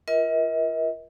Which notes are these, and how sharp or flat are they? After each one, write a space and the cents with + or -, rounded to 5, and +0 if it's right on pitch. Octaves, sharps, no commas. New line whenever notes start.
F4 -15 A#4 +35 D#5 +45